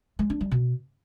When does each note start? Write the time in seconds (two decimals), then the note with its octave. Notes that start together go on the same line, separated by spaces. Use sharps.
0.19 G#3
0.30 D4
0.41 G3
0.51 B2